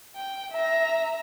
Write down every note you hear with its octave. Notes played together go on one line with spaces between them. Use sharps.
G5
E5 A#5